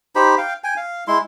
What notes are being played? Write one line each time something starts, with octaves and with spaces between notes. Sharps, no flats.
D#4 G4 C5 B5
F5 G5
G5 G#5
F5
G#3 E4 C6